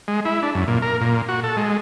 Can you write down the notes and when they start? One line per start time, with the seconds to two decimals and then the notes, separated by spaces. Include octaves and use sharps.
0.08 G#3
0.25 E4
0.42 D4
0.55 F#2
0.68 A#2
0.82 A#4
1.01 A#2
1.29 F#4
1.44 A4
1.57 G#3